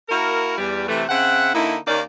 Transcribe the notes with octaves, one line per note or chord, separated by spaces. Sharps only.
A#3 E4 F#4 A#4
E2 G3
C3 E3 A3
C#3 C4 E5 F#5
D3 A#3 D#4 E4
D#2 D#3 A#3 C#4 D#4 D5